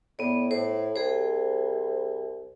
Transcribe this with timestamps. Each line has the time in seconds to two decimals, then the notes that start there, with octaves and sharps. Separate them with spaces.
0.19 A2 B3 D5
0.51 A2 C5
0.96 C2 G#4 C5